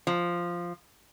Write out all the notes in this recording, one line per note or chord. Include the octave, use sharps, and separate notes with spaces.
F3